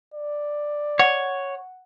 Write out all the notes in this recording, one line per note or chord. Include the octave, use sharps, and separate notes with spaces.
D5
C#5 F#5